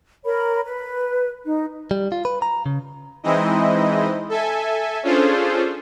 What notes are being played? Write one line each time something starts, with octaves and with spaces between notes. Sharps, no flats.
A#4 C#5 B5
B4
D#4
G3
F4
B4
A#5
C#3
E3 G#3 C4 D#4 E4 D#5
A4 E5 G#5
C#4 D4 F4 G#4 A4 C5